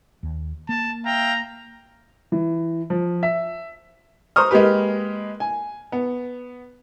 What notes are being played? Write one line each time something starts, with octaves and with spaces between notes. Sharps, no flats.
D#2
A#3 A5
E5 F5 G5 A#5
E3
F3
E5
C5 A#5 C#6 D#6 F6
G#3 A#3 G4 B4
G#5
B3